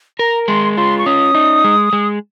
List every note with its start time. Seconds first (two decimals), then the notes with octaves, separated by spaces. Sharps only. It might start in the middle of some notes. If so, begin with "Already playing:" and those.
0.19 A#4 A#5
0.48 G#3 C6
0.77 F4 C6
0.99 C#6
1.06 C#4 D#6
1.35 D#4
1.64 G#3
1.93 G#3